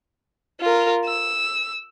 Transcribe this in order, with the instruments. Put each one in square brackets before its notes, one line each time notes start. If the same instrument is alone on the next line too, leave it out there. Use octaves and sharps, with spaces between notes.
[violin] F4 A#4
E6